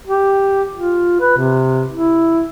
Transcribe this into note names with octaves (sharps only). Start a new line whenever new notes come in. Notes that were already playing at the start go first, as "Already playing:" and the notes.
G4
F4
B4
C3
E4